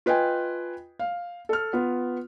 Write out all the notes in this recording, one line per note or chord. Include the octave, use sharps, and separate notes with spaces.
F4 B4 D#5 G5 G#5
F5
A4 F6
B3 F4